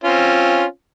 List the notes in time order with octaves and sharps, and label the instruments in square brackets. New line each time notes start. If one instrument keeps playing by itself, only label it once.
[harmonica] C4 C#4 F4